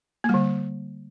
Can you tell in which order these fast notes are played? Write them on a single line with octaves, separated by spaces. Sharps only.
A#3 G3 D3